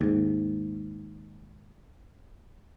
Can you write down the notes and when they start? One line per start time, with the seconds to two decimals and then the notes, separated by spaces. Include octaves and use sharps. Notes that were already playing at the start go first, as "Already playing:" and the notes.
0.01 D#2 G#2